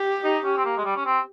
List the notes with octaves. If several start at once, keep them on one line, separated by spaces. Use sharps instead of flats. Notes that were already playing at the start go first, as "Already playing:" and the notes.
Already playing: G4
D#4
C#4
C4
A#3
G#3
G3
C#4
C4